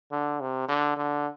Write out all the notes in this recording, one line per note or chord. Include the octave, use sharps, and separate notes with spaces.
D3
C3
D3
D3